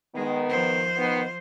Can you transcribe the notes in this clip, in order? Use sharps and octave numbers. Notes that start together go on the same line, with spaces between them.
D#3 G#3 B3
F3 C5
D#3 B3